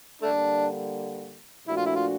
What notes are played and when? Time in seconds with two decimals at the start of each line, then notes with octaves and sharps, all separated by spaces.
0.22 D3 G3 A3 A#3 D4
1.67 A#2 F3 A3 D4 E4 F#4
1.77 F4
1.86 E4
1.95 F4